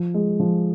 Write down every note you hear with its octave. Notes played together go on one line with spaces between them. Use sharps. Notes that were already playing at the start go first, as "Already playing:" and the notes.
Already playing: F3
G#3
F3